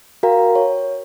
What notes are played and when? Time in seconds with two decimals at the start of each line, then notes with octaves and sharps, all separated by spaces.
0.23 F#4 A#4 F5 G5 A#5
0.55 C#5